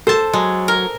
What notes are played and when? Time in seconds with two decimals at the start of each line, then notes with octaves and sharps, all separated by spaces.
0.07 A4 C5 A5
0.33 F#3 G#3
0.68 A#4